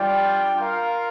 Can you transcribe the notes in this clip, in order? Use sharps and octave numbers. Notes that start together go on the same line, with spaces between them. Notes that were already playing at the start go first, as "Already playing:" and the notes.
Already playing: G3 D4 F4 D5 G5
F4 A#4 F5